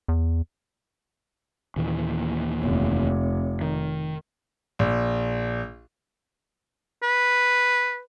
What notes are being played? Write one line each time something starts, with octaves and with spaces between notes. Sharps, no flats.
E2
D#2 A#2 E3
F1
D#3
A#1
B4